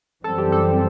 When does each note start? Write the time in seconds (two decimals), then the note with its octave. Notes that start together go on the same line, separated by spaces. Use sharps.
0.24 F#2 E3 G3 C4 A4
0.38 G4
0.52 A4